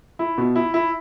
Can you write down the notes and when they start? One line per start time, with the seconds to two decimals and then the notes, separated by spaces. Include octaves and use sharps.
0.19 E4
0.38 B2
0.56 E4
0.74 E4